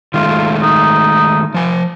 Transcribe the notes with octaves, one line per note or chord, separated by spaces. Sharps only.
D#3 G#3 A3 F4
D#4
F3 G#5